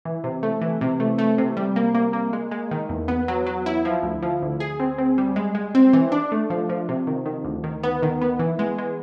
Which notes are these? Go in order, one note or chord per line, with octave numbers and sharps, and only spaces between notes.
E3
C3
A3
E3
C3
A3
A3
C3
G3
A#3
A#3
A#3
G#3
G#3
D#3
E2
B3
F#3
F#3
E4
F3
D2
F3
D2
G#4
C4
C4
G3
G#3
G#3
C4
E3
D4
A3
F3
F3
C3
D#3
D#3
D2
D#3
B3
D#3
B3
E3
G#3
G#3